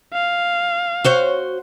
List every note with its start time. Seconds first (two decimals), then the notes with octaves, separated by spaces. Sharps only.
0.14 F5
1.05 F#4 C5 C#5